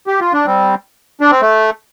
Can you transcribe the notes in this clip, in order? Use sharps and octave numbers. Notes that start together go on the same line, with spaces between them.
G4
F4
D4
G3 C4
D4
C4
A3